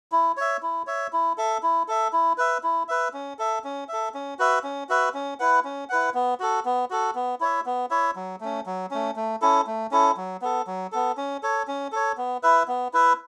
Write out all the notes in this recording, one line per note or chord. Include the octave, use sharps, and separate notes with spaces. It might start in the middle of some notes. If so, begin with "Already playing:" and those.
E4
C#5 E5
E4
C#5 E5
E4
A4 E5
E4
A4 E5
E4
B4 E5
E4
B4 E5
C#4
A4 E5
C#4
A4 E5
C#4
F#4 B4 E5
C#4
F#4 B4 E5
C#4
E4 B4 F#5
C#4
E4 B4 F#5
B3
F#4 A4
B3
F#4 A4
B3
E4 C#5 E5
B3
E4 C#5 E5
F#3
A3 C#4
F#3
A3 C#4
A3
C#4 E4 A4
A3
C#4 E4 A4
F#3
B3 A4
F#3
B3 A4
C#4
A4 C#5
C#4
A4 C#5
B3
E4 B4 E5
B3
E4 B4 E5